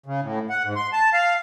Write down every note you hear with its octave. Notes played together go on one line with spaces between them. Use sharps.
C#3
A2
F#5
G#2
C6
A5
F5